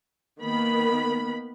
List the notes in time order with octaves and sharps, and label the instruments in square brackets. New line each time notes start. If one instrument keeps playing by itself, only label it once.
[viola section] D#3 A#3 B3 B5